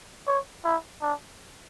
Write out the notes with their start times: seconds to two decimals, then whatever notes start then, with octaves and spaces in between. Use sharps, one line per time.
0.27 C#5
0.65 E4
1.02 D4